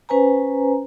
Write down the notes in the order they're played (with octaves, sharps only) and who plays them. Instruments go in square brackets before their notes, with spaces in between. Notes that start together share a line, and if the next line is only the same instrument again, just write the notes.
[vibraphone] C#4 B4 C5 G#5 A#5